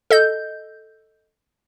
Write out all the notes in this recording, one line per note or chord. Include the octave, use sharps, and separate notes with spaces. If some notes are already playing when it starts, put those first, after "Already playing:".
A4 D#5 G6